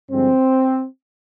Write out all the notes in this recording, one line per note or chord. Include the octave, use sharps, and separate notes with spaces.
G2 D3 F3 G#3 C4